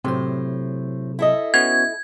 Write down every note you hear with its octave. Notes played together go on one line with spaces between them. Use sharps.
A2 C3 F#3 C5
E4 A4 D#5
B3 C#4 F#4 G#6